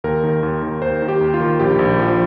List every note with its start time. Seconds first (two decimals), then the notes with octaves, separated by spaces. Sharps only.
0.04 D#2 A#4
0.24 D#3
0.43 D#2
0.63 D#3
0.82 D#2 C5
1.02 D#3
1.08 G4
1.21 D#2
1.34 F4
1.40 D#3
1.60 A#1 G4
1.79 A#1
1.99 F3